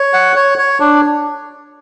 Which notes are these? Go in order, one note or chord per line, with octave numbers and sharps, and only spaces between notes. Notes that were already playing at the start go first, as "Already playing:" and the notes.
Already playing: C#5
F#5
C#5
C#5
D4